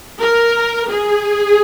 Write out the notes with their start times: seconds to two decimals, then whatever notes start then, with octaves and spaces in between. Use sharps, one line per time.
0.21 A#4
0.90 G#4